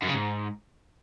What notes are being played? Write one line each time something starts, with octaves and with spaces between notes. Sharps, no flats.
F#2
C#3
G#2